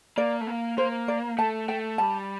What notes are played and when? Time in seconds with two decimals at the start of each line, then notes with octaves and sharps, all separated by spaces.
0.17 A#3 D5
0.41 A3
0.47 A#3
0.78 A#3 C5
1.08 D5
1.38 A3 A5
1.68 A3 G5
1.98 G3 A5